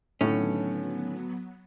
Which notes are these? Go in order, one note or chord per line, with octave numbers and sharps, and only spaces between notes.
A2 D3 D#3 F#3 A3 B3 C#4